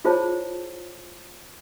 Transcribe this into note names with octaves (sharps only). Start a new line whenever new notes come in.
E4 F4 G#4 C5 C#5 A5